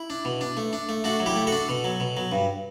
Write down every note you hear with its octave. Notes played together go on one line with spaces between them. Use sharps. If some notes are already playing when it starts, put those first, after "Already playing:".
Already playing: E4
D4
B2
D4
A3
D4
A3
A3 D4 F#4
F#3
E4 G4
A3
F#4 A4
D4
B2
F#3
B2
F#3
G2